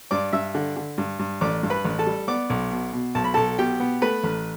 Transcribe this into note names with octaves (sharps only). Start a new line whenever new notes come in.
G2 D5 D6
G2 E5 E6
D3
D3
G2
G2
A1 D5 D6
G2
B4 B5
A1
A4 A5
G3
B3 D5 D6
B1
B2
B2
B1 A5
B5
B1 A4 A5
B2 G4 G5
B3
A3 B4 B5
A1